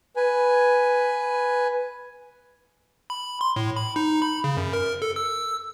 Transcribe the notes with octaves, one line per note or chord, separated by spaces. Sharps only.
B4 G#5
B5
C6
A2
B5
D#4
B5
C#3
F#2
A#4
A4
E6